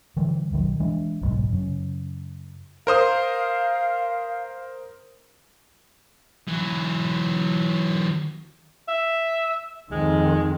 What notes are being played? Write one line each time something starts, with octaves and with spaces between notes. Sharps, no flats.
D3 E3 G3
E1 B1 D#3 F#3
E3 G#3 D4
F#1 B1 G#2
F#2 C#3
A#4 C5 F5 D#6
E3 F#3
E5
F2 D#3 G#3